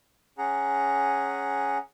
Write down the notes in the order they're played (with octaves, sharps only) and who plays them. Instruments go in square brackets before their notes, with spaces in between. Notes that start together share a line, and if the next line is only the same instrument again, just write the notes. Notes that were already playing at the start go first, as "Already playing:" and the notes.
[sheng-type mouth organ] C#4 G#4 F#5 A#5